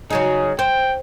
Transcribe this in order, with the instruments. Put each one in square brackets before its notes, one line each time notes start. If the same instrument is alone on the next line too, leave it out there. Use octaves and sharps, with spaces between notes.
[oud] C#3 F#3 D#4 [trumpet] G#4
[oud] C5 [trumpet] G5